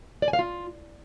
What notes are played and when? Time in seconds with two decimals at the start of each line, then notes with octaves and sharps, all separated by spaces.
0.22 D5
0.28 G#5
0.33 F5
0.39 F4